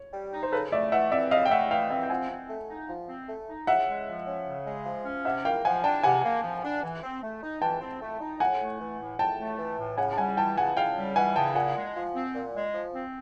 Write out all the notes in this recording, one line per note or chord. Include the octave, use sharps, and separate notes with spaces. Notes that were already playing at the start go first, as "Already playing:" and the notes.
Already playing: C#5
G3
D#4
C5
C#3 A4 B4
A3 D5 E5
E3 E5 F#5
C4 D5 E5
C#3 D#5 F5
G5
A3 E5 F#5
E3 F5 G5
C4 F5 G5
G5
F3 F#5 G#5
C4
A3
D#4
F3
C4
A3
D#4
C#3 E5 F#5
G#3
F3
C#4
C#3
G#3
F3
C#4
C3 E5 F#5
A#3 F5 G5
F3 F#5 G#5
D4 G5 A5
C3 F#5 G#5
A#3
F3
D4
E3
C4
A3
D#4
E3 G5 A5
C4
A3
D#4
A2 F#5 G#5
A3
E3
A2
A2 G5 A5
A3
E3
A2
C#3 F#5 G#5
A5
G3 F#5 G#5
E3 G5 A5
C#3 F#5 G#5
C#3 F5 G5
G3
E3 F#5 G#5
C#3 G5 A5
A#2 F#5 G#5
G#3
F3
C4
A#2
G#3
F3
C4